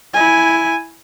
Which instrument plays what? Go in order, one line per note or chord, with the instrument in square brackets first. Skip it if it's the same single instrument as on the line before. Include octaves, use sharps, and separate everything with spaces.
[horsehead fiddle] E4 G#5